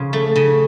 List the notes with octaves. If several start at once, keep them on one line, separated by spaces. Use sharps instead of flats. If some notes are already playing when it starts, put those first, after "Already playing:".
Already playing: C#3 F3
A3
C#3